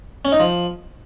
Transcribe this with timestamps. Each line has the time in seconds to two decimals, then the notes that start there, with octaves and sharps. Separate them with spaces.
0.25 C#4
0.32 D#4
0.40 F3